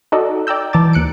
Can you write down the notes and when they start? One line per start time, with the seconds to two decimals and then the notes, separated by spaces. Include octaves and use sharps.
0.12 D#4 F#4 A4 D5 D#5
0.47 D5 G5 A#5 E6 G6
0.73 E3 A5 A#5 D6 A6
0.93 D#2 F#6 C#7 D7